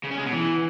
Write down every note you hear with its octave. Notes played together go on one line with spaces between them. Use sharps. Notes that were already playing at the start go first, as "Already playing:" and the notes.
C#3
C#4
G#3
B2
E3